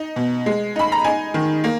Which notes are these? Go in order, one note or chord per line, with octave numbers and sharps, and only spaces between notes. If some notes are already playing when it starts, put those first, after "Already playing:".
Already playing: D#4
B2
G#3
D#4 B5
A#5
D#4 G#5
D#3
A#3